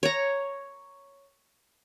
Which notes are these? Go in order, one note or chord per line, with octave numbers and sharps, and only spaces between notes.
C#5 A#5